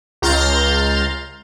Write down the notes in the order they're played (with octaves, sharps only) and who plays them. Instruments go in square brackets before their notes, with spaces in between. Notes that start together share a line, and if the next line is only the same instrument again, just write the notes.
[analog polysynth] C#2 A#5 C6 F6 G6 A6